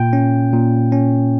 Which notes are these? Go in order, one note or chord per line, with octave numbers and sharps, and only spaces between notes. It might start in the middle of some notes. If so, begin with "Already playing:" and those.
Already playing: A#2 G5
C#4
A#2
C#4